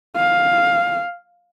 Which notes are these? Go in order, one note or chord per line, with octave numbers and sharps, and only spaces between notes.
F5